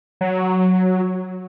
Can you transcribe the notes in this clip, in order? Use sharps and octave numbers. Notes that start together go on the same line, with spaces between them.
F#3